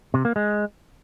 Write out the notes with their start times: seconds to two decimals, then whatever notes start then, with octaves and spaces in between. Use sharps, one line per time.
0.14 C3
0.25 A#3
0.36 G#3